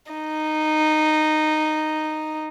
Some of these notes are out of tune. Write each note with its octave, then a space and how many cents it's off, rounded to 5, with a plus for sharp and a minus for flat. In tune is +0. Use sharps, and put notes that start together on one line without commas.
D#4 -10